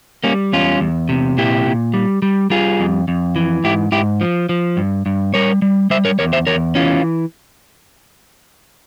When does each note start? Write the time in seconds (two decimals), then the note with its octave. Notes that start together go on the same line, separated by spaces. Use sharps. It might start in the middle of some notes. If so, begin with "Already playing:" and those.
0.24 G3 A#3 C#4
0.53 E2 C#4 F4
0.80 E2
1.09 C3
1.37 A#2 E4 G4
1.66 A#2
1.94 G3
2.22 G3
2.50 G3 F4 G#4
2.80 F2
3.08 F2
3.36 E3
3.64 G#2 E4 G4
3.92 G#2 E4 G4
4.21 F3
4.49 F3
4.77 G2
5.06 G2
5.34 G3 A#4 C#5
5.62 G3
5.90 G3 C5 E5
6.05 A#4 C#5
6.19 E2 A#4 C#5
6.33 C5 E5
6.47 E2 A#4 C#5
6.75 E3 C#4 F4